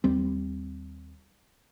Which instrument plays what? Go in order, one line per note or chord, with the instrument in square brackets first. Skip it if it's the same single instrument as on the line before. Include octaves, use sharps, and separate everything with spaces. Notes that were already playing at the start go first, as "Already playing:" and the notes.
[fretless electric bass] D#2 G3 C4